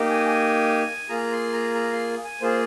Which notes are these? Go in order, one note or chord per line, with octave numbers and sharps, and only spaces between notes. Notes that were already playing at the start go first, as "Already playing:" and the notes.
Already playing: A#3 D#4 G4
G#5
G#5
A#3 F4 G#4 A#5
C6
A#5
A#5
C6
G#5
A#3 F4 G#4 C5